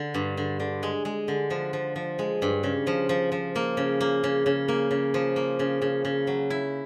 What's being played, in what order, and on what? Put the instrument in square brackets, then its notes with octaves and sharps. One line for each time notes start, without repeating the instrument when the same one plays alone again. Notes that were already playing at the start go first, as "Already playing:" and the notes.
Already playing: [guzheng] D3
G2
D3
D3
G#3
G#3
D3
F3
F3
F3
G#3
G2
C#3
F3
F3
F3
A#3
C#3
A#3
C#3
C#3
A#3
C#3
F3
A#3
C#3
C#3
C#3
F#3
E4